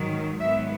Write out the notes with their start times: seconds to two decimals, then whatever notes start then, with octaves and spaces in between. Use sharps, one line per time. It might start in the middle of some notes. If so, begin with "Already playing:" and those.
Already playing: G#2 D#3 F#3
0.40 G#2 D#3 F#3 B3 E5